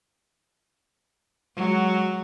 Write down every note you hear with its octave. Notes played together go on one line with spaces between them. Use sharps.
F#3 G#3